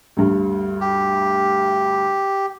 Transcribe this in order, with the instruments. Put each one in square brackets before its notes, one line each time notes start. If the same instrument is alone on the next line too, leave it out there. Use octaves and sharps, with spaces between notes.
[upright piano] D2 G2
[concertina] G4